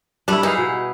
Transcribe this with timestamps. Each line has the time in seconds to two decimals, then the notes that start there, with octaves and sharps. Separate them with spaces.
0.28 G3 A3 D4 E4
0.43 E3 D#4 E4 G#4 F5
0.57 B2